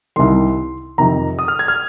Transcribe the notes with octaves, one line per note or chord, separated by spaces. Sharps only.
C2 C3 D#3 C6
F2 C3 D#3 A#5
D#6
F6
G#6
F6